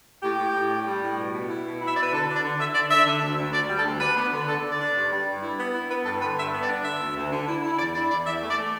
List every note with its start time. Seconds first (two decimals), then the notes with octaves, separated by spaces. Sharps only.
0.22 A2 G4
0.38 A2
0.54 A2
0.69 D4
0.86 G3
1.01 A2
1.17 B2
1.32 B2
1.48 E4
1.64 B2
1.80 E4
1.86 E5
1.95 B2 D5
2.03 B4
2.11 D3 A4
2.27 D4
2.35 D5
2.42 D3
2.58 D3 E5
2.74 D3 D5
2.90 D3 E5
3.06 D3
3.21 D2
3.38 D2
3.53 D2 D5
3.69 G3
3.77 A4
3.85 D2
4.00 D4 B4
4.16 B3
4.32 D3
4.47 D3 A4
4.63 D3
4.71 D5
4.79 D4
4.95 G2
5.11 G3
5.26 G2
5.42 E4
5.57 B3
5.73 E4
5.89 B3 B4
6.04 G2 A4
6.21 D3 B4
6.37 G2 E5
6.52 B3
6.61 D5
6.68 D4
6.84 D3 E5
7.00 D2
7.15 D2
7.31 D3
7.46 E4
7.62 E4
7.78 E2 D5
7.94 E4 D5
8.10 E2 D5
8.25 E2 E5
8.41 A3
8.49 D5
8.57 A3